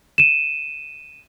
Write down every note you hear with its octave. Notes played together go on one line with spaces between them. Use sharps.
D#7 E7